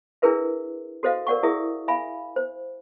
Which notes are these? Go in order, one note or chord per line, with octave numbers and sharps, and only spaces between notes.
D4 E4 G#4 A#4 B4 E5
F#4 A4 C5 D#5 F5
A#4 D5 F#5 C#6
E4 G#4 A#4 E5 D#6
E5 F5 G#5 B5
C5